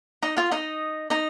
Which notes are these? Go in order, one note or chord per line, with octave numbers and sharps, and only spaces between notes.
D#4 D#5
F4 F5
D#4 D#5
D#4 D#5